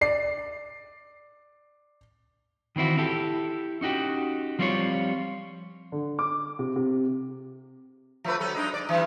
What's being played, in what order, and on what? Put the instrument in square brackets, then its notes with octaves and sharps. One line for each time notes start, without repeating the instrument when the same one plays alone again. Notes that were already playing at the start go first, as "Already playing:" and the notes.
[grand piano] D5 C7
[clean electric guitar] D#3 E3 C4 E4 F#4
E4 G4 A4
C#4 D#4 F#4 G4
F3 G3 C4 F4 B4 C#5
[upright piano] D3
D6
C3
C3
[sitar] F3 A3 B4
F#3 A4
G#3 D4 D#4
D5
E3 G3